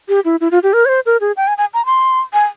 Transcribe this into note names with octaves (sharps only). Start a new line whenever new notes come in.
G4
E4
E4
F4
G4
A#4
C#5
C5
A#4
G#4
G5
G#5
G#5
A#5
C6
G#5